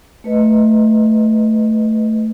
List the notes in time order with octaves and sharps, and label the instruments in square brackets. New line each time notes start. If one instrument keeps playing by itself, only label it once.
[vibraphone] A3 B4 D#5